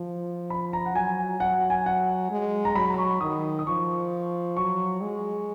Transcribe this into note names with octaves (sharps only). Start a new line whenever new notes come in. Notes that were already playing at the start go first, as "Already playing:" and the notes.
Already playing: F3
B5
A#5
F#5
F#3 G#5
F#3 F#5
G#5
F#5
G#3
A#5
F#3 B5
B5
C#6
D#3 D#6
D#6
F3 C#6
F#3 C#6
G#3